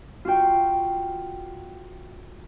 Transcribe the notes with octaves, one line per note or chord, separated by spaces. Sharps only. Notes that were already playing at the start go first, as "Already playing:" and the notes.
F4 F#4 G5